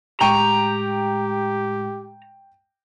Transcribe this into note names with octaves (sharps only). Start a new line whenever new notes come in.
A2 G#3 G4 G5 A#5 C#6 D#7